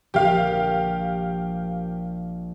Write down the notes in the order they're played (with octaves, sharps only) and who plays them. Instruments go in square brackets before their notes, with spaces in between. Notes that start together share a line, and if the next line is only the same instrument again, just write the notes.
[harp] A#1 [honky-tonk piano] G4 F5